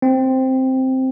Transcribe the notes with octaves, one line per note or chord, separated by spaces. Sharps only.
C4